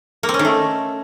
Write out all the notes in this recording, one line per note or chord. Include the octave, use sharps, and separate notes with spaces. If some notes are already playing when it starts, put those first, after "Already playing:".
A#3
C4
C#4
D#3
A3